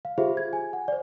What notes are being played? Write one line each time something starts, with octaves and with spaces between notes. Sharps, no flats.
F5
F4 G4 G#4 C5 E5
G#6
G#5
F#5
C5 D5